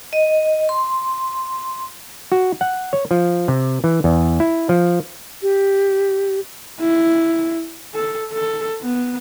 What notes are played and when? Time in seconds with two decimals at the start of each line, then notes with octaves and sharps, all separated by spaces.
0.13 D#5
0.69 C6
2.32 F#4
2.61 F#5
2.93 C#5
3.11 F3
3.48 C3
3.84 E3
4.04 E2
4.40 E4
4.69 F3
5.42 G4
6.80 E4
7.95 A4
8.32 A4
8.82 B3